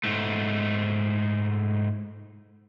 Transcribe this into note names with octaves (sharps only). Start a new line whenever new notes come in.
G#2 A3